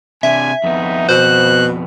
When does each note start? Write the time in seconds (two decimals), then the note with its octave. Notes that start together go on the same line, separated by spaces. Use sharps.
0.23 C3 D4 E5 G#5
0.64 F2 B3 D#4
1.09 B2 C5 F#6